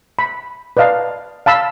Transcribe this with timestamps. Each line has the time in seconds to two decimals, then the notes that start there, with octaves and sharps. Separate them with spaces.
0.19 B5
0.77 B4 D5 D#5 F5 A5
1.46 F5 A5 B5 E6